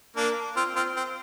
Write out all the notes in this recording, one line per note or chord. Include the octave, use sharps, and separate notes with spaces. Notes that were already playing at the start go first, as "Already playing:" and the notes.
A#3 D4
C4 F4
C4 F4
C4